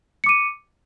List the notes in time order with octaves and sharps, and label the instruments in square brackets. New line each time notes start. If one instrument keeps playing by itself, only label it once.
[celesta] C#7
D6
D#7